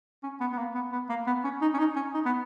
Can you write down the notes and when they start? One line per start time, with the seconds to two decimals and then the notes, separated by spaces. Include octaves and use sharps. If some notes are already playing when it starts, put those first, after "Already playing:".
0.23 C#4
0.40 B3
0.52 B3
0.58 A#3
0.75 B3
0.92 B3
1.09 A#3
1.27 B3
1.44 C#4
1.61 D#4
1.74 C#4
1.79 D#4
1.96 C#4
2.14 D#4
2.25 B3